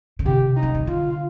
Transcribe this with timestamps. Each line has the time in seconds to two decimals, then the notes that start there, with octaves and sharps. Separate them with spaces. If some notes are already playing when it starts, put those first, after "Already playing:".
0.19 D3
0.26 C3 G4
0.56 D#4
0.63 F3
0.74 D#3
0.87 D3 F4